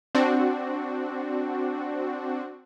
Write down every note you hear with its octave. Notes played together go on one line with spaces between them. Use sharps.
C4 D4 F#4